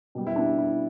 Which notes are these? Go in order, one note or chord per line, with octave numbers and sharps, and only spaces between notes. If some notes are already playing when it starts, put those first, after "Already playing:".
B2 G3
E4
D4
E4